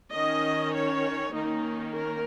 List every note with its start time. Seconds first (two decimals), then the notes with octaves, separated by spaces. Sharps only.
0.12 D#3 C#4 D#5
0.73 C#5
1.34 D#3 A#3 C#4 D#4
1.95 A#4